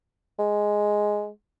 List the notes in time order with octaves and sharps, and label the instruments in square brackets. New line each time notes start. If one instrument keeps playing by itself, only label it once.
[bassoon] G#3